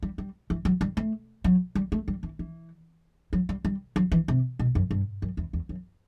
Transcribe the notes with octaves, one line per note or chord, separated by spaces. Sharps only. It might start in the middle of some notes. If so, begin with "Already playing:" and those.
G3
G3
E3
F#3
G3
A3
F#3
G3
A3
G3
E3
E3
F#3
G3
G3
F#3
E3
C3
B2
F#2
G2
F#2
E2
E2
F#2